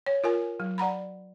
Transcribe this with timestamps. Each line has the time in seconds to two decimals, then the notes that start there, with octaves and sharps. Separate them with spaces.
0.07 C#5
0.24 F4 A#4 G#5
0.60 F#3
0.78 D5 F#5 A#5 B5